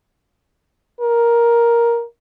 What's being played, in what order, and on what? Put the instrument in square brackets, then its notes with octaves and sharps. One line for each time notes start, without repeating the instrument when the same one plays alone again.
[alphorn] A#4